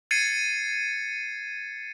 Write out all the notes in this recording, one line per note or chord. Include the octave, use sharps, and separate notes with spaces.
G#6 A6 C7 C#7 D#7